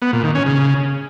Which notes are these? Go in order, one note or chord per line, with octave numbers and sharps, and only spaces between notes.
B3
A#2
D#3
C#4
C#3